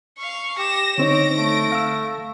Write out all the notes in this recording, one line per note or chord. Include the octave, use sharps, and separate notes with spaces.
F5 C#6
G4 A#6 E7
D3 C4 D#4 C#5 A#6 D7
A3
F5 E6